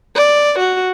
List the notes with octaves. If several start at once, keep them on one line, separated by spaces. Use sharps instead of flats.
D5
F#4